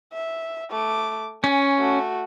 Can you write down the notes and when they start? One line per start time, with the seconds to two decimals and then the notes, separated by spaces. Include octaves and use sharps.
0.13 E5
0.71 A3 D6
1.44 C#4 G#5
1.79 A3 F#4